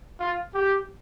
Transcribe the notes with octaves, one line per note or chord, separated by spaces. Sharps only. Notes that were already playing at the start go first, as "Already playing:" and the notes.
F4
G4